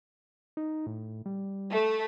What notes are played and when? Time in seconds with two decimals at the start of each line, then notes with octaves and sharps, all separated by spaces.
0.57 D#4
0.86 A2
1.26 G3
1.71 A3